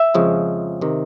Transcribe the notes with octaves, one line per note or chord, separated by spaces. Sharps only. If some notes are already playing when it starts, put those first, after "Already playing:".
Already playing: E5
F2 C#3 F3 G#3
C3 D#3